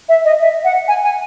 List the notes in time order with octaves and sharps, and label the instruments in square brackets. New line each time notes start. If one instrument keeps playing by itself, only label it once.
[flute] E5
D#5
E5
F#5
G#5
G#5